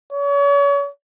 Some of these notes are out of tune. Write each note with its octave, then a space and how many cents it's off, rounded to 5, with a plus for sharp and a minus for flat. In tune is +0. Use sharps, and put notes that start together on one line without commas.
C#5 +35